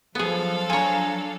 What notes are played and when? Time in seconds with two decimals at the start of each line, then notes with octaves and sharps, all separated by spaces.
0.15 F3 F#3 B3 G#4 A4 F5
0.70 F3 D4 C#5 G#5 A#5